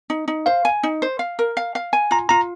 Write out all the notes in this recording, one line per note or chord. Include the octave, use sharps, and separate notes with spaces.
D#4
D#4
C5 F5
G#5
D#4
C5
F5
A#4
F5
F5
G#5
F4 A#5
F4 A#5